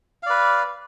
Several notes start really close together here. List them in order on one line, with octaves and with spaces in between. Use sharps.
F5 D5 B4